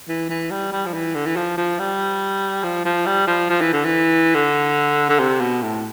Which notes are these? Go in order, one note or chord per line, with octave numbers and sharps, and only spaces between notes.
E3
E3
G3
G3
F3
E3
D3
E3
F3
F3
G3
F3
F3
G3
F3
F3
E3
D3
E3
D3
D3
C3
B2
A2